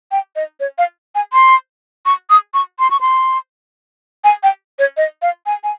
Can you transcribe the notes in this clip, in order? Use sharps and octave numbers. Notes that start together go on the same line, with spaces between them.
G5
D#5
C#5
F5
G#5
C6
C#6
D#6
C#6
C6
C#6
C6
G#5
G5
C#5
D#5
F5
G#5
G#5